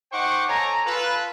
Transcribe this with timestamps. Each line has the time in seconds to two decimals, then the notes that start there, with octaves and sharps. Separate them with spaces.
0.12 D#4 C5 F#5 G5 C#6 D6
0.48 A4 C#5 G#5 A#5
0.85 F4 A4 B4